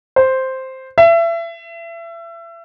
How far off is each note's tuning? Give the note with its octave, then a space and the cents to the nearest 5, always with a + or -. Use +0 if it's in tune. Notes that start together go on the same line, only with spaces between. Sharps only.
C5 +0
E5 +30